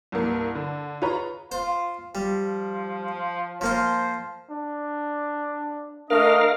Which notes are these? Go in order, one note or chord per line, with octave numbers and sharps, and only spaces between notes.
C2 G2 A#3
D3
F4 G#4 B4 C#5 A#5 B5
F4 C5
F3 G3
F3 A#3 F4 C5
D4
A3 D4 A#4 D#5 F5